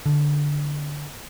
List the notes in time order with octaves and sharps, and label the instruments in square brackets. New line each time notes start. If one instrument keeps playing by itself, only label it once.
[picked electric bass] D3